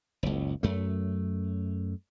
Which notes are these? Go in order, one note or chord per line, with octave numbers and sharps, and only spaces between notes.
F#1 C#2
F#2 A3